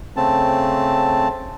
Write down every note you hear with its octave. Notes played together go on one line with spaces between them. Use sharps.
C#3 A3 C4 A5